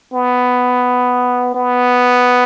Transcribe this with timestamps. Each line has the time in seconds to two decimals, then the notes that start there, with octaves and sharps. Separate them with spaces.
0.13 B3
1.54 B3